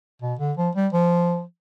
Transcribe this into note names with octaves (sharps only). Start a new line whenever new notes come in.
B2
D3
F3
G3
F3